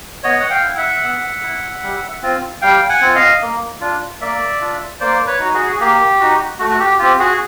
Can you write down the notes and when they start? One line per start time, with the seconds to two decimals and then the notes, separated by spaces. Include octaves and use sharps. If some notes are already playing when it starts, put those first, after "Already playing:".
0.23 B3 C#5 D#5
0.39 F#5
0.50 F5 G5
0.64 E4
0.77 E5 F#5
1.04 B3
1.43 E4
1.83 G3
2.22 C4 F4
2.62 G3 F5 G5
2.89 F#5 G#5
3.01 C4 F4
3.15 D#5 F5
3.42 A#3
3.81 D4 F4
4.20 A#3 D5 E5
4.61 D4 F4
5.00 A#3 C5 D5
5.26 B4 C#5
5.40 D#4 F#4
5.53 F#4 G#4
5.72 G#4
5.80 A#3 G4
6.20 D#4 F#4
6.59 A3 F#4
6.69 F#4
6.79 G4
6.99 C4 F4 G4
7.19 F#4 G#4